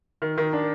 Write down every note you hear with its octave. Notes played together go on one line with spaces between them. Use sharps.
D#3
D#3
D4